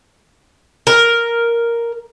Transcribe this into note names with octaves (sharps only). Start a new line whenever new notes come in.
A#4